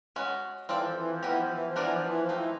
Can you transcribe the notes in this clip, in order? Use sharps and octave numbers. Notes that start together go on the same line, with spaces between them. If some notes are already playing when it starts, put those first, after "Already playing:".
G#3 C#4 F#4
E3 C4 F4 A4 D5
F3
E3
F3
E3 B3 E4 G4 A#4
F3
E3
F3
E3 B3 D4 F4 A#4 D5
F3
E3
F3
A3 C4 D#4
E3